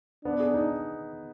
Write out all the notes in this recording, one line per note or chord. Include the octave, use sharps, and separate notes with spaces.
B3 D4
G#4
D#4